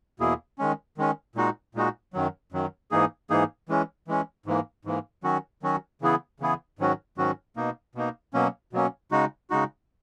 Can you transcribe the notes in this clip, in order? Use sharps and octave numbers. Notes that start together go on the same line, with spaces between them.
E2 B2 A#3 E4 G#4
D#3 G#3 C#4
D#3 G#3 C#4
A#2 G#3 D#4 F#4
A#2 G#3 D#4 F#4
F#2 D#3 F#3
F#2 D#3 F#3
G#2 E3 A#3 D#4 G#4
G#2 E3 A#3 D#4 G#4
E3 G#3 C#4
E3 G#3 C#4
G#2 E3 A#3
G#2 E3 A#3
D#3 F#3 C#4 F#4
D#3 F#3 C#4 F#4
C#3 E3 B3 E4 G#4
C#3 E3 B3 E4 G#4
G#2 D#3 F#3 C#4 F#4
G#2 D#3 F#3 C#4 F#4
B2 A#3 D#4
B2 A#3 D#4
B2 F#3 A#3 C#4
B2 F#3 A#3 C#4
C#3 G#3 D#4 F#4
C#3 G#3 D#4 F#4